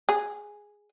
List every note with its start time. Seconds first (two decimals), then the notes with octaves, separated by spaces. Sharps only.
0.09 G#4